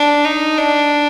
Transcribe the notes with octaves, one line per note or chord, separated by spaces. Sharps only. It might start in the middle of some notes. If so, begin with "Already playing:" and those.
Already playing: D4
D#4
D4